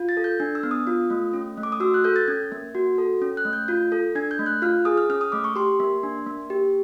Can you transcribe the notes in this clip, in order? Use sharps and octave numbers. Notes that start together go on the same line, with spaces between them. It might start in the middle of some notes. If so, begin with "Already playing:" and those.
Already playing: F4
A6
A4
G6
D4
E6
B3
D#6
F4
A3
C#4
A3
D6
D#6
F#4 E6
F#6
A4 G6
A6
C#4 G#6
A#3
F#4
A4
C#4
F#6
A3
G6
F4 G6
A4
D4 G#6
G6
A3
F#6
F4 F6
G#4 D#6
F6
C#4 F6
D#6
A3 D6
C#6
G4 C6
A#3
D4
A#3
G4